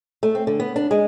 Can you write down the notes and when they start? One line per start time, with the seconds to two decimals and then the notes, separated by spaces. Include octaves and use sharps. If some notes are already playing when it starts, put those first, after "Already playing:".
0.23 A3
0.35 C4
0.47 D3
0.60 B3
0.76 D4
0.91 G#3